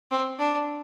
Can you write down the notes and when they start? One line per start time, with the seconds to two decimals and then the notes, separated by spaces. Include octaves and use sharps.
0.11 C4
0.39 D4